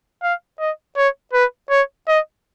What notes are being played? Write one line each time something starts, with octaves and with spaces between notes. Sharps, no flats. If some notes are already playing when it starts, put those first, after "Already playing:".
F5
D#5
C#5
B4
C#5
D#5